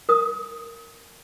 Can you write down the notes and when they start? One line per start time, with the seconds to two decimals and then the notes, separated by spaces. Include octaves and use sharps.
0.09 A#4 D#6